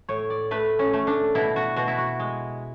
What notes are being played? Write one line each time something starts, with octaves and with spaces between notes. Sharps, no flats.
A2 C#5
D5
A3 B4
C#4
A3
D4
B2 E4
F#4
B2 F#4
E4
F#4
G#3